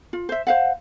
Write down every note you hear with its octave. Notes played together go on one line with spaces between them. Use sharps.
F4
C5 E5
C5 F5 F#5